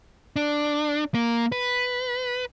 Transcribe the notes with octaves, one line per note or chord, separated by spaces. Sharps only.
D4
A#3
B4